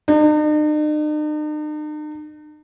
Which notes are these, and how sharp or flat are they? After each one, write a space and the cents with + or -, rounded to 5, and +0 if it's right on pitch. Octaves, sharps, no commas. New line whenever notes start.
D#4 -45